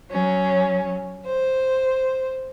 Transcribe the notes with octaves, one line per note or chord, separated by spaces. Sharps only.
F#3 C#4
C5